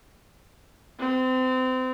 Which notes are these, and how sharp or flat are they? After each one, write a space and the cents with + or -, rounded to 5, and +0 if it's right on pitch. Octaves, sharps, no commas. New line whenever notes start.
C4 -30